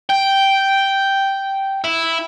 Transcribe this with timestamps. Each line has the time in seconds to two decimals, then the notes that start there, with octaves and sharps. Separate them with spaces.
0.09 G5
1.84 E4